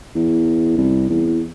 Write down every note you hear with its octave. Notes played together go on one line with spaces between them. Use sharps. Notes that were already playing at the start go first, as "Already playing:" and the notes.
E2
C2
E2